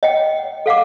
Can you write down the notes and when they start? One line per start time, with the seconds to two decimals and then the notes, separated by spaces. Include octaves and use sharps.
0.03 D#5 F#5 G5
0.66 A4 F5 F#5 D6